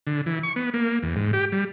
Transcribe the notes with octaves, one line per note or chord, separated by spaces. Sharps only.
D3
E3
C#6
B3
A#3
E2
G#2
G4
G3